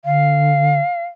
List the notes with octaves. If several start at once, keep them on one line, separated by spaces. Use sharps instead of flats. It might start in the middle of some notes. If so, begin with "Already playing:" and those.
D3 F5